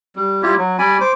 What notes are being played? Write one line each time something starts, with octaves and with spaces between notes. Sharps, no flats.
G3
G3 E4 F4 G4
F#3
G3 D5 G#5 B5
C5 D6